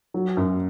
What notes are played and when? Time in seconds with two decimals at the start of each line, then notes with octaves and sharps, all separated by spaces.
0.14 F#3
0.37 F#2